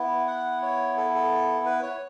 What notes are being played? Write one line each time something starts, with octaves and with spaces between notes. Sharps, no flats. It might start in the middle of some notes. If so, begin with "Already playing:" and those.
Already playing: B3 E4
F#5
C#5
A4
A4
B4
C#5